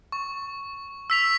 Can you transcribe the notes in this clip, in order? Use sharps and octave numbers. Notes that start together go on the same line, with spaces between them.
C#6
E6 B6 F7